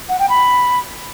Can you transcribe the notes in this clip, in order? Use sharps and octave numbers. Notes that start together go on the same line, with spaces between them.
F#5
G5
B5